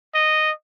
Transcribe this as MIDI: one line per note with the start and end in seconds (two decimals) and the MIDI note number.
0.15 0.51 75